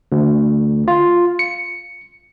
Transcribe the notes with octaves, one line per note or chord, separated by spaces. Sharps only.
D2
F4
C#7